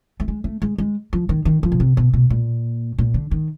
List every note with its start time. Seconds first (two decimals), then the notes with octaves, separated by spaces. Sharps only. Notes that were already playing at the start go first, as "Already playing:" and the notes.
0.20 A3
0.28 G#3
0.44 A3
0.62 G#3
0.78 G#3
1.13 F3
1.29 D#3
1.45 D#3
1.63 F3
1.72 B2
1.80 C3
1.97 B2
2.14 B2
2.30 A#2
2.98 A#2
3.14 D3
3.31 D#3